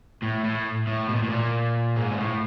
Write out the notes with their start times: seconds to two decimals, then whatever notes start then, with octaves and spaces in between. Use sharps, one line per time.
0.22 A2
0.44 A2
0.87 A2
1.09 B2
1.16 A#2
1.23 A2
1.30 A#2
1.96 G#2
2.11 A#2
2.17 A2